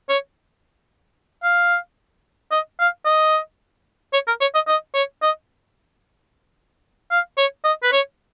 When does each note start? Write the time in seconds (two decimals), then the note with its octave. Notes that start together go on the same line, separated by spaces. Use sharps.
0.09 C#5
1.44 F5
2.52 D#5
2.80 F5
3.06 D#5
4.13 C#5
4.28 A#4
4.41 C#5
4.55 D#5
4.68 D#5
4.95 C#5
5.22 D#5
7.12 F5
7.38 C#5
7.64 D#5
7.83 B4
7.92 C#5